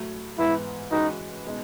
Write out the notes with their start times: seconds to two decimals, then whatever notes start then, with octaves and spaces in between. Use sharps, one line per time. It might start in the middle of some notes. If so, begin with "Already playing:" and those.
Already playing: A2 F#3 A3
0.38 G#2 E3 B3 E4
0.91 E3 G#3 C#4 D#4 F#4 B4
1.46 B2 G#3 D#4